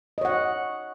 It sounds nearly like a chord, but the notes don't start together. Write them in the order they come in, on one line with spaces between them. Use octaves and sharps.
D#5 C#5 F#5